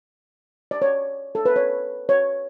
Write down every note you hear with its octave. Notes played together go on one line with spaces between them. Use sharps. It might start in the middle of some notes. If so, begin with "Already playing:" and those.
D5
C#5
A4
B4
C#5
C#5